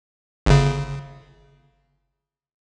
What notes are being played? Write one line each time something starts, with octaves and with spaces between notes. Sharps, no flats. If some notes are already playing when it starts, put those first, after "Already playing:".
G1 C#3